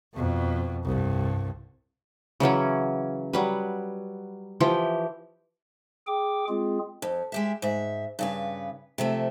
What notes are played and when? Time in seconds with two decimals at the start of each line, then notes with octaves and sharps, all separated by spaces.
0.14 F2 B2
0.85 C2 G2
2.40 C#3 E3 F#3 C#4
3.33 F#3 G3 B4
4.60 E3 F3 G4
6.07 G#4 G5 D6
6.49 G#3 C4 F4 G#4
7.02 F2
7.32 G#3 G4 E5
7.62 G#2 E5
8.19 G2 C#3 B4
8.98 C3 F3 A3